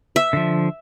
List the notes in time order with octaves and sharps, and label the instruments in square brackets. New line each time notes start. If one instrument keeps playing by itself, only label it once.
[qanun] E5
[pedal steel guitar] D3 F3